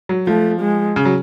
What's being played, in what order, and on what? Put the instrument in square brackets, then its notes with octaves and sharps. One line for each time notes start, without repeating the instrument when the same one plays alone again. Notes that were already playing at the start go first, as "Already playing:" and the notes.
[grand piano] F#3
[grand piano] F3 [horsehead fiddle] A3
[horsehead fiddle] G#3
[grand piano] C#3
F#3